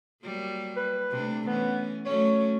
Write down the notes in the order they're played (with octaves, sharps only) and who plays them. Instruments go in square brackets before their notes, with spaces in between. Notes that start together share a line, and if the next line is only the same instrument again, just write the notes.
[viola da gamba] F#3 G3 A#3
[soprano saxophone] B4
[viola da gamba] C3 A3 D4
[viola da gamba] E3 C#4 [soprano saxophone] B3
[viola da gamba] F#3 A3 C#4 [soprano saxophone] C#5